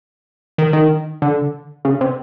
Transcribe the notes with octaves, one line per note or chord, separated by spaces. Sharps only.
D#3
D#3
D3
C#3
C3